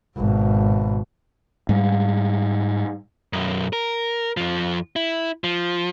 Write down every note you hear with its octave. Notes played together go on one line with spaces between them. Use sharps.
G#1 B2
G#2 G3
B1 F#2
A#4
F2 F3
E4
F3